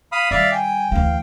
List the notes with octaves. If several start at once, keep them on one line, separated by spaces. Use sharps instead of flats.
F5 B5 D#6
D#3 G3 D5 E5 F5
G5 G#5
D2 E3 F5